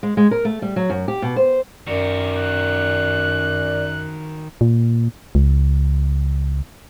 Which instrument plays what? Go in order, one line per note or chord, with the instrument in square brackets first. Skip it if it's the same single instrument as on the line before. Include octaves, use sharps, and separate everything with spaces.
[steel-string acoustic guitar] G#3
G#3
A#4
A3
G3
F#3
F#2
G4
B2
C5
[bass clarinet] F#2 [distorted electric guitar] D#3 F#4 [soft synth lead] D5
[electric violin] F#6
[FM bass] A#2
C#2